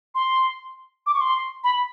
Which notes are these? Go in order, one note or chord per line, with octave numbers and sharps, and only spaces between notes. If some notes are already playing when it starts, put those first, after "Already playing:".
C6
D6
C#6
C6
B5